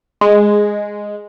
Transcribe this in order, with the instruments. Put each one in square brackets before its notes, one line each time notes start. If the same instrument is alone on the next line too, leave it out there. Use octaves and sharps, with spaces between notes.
[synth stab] G#3